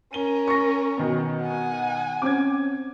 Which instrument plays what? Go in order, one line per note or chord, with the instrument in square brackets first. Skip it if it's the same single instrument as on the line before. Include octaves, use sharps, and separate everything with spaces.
[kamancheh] C#4 A#4 [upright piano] D#7 G7
[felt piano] C#6 A#6
[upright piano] B2 D#3 B3
[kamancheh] F#5 G#5
[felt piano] C4 C#4 [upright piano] D6 G#6